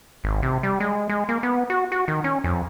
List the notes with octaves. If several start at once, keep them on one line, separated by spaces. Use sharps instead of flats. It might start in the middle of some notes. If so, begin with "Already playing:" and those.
G#1
C3
G3
G#3
G#3
A#3
B3
F#4
F#4
D#3
C#4
F2